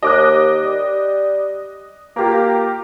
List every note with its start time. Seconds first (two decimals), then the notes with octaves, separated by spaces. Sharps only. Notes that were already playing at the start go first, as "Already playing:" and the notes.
0.03 D#2 D#5 D6 F#6
0.63 G3
2.16 A#3 F4 G4 A#4